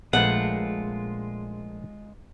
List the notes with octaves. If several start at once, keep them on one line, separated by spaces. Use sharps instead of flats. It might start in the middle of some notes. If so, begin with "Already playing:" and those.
A#1 G#3 A3 F4 B4 F#5